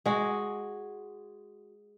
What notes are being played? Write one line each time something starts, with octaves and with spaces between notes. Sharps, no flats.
G#3 F#4